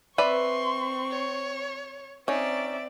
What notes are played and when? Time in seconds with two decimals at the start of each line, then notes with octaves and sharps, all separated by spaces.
0.18 C4 B4 D5 E5 C6 C#6
1.11 C#5
2.28 C4 C#4 D#4 D5 E5